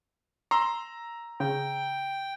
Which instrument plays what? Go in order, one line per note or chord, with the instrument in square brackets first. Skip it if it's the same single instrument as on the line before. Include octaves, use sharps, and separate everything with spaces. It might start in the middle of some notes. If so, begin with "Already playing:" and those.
[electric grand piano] A#5 E6 [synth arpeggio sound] C6
[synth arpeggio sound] C#3 [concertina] G5